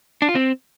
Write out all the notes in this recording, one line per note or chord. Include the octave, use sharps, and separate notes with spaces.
D4
F4
C4